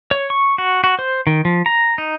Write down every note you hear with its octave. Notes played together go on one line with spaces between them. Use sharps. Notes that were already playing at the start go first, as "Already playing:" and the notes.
C#5
C#6
F#4
F#4
C5
D#3
F3
A#5
D#4